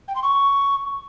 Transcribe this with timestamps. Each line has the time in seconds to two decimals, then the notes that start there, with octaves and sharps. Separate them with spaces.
0.08 G5
0.15 C6
0.23 C#6